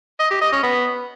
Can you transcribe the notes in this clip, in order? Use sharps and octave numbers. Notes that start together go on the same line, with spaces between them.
D#5
G4
D#5
C#4
B3